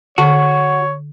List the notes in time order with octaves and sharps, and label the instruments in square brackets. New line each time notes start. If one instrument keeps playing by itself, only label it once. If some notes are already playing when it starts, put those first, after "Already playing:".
[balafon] D3 C#6 [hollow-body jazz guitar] F#4 [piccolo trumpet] C#5